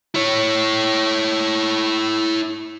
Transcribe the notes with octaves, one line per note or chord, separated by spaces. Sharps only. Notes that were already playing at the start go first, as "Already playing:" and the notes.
E4 C#5